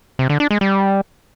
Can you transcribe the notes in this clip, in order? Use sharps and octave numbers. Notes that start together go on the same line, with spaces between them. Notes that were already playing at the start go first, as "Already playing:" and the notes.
C3
D3
D4
G#3
G3